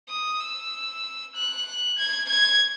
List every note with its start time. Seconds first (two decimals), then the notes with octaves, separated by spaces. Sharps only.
0.09 D#6
0.40 E6
1.35 F#6
1.99 G#6
2.29 G#6